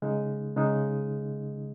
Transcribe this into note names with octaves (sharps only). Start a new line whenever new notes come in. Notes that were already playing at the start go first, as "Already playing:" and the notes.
C#3 G#3 D#4
C#3 G#3 D#4